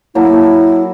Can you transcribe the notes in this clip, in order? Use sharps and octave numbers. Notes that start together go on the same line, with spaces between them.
F#3 A#3 E4 A4